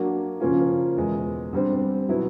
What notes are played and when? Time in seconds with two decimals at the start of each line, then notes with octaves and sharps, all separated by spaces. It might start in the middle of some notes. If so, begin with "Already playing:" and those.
Already playing: F#3 A#3 D4 F#4
0.40 C#3 F3 A#3 C#4 F4
0.97 E2 B2 G#3
1.53 D3 G3 C4
2.09 B2 F#3 B3 E4